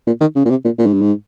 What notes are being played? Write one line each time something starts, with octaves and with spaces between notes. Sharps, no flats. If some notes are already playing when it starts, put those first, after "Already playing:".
A#2
D#3
C#3
A#2
C3
A#2
A#2
G#2
G2
G#2